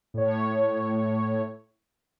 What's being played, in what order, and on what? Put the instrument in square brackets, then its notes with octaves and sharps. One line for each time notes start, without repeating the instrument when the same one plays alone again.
[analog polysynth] A2 C#5